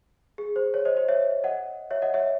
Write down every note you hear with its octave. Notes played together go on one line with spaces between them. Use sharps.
G#4
C5
C#5
C5 D#5
C5 D#5
C#5 E5
D#5 F#5
C#5 E5
D#5 F#5
C#5 E5